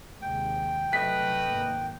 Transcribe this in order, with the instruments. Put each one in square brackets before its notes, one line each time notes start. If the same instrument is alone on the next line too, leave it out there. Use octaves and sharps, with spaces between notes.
[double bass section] D#2 C3 G#3 [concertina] G5
[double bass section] F1 F#3 [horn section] A3 B4 D#5 [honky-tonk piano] B6
[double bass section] G#1 A#3